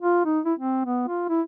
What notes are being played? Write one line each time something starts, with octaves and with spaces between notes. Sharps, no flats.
F4
D#4
E4
C4
B3
F4
E4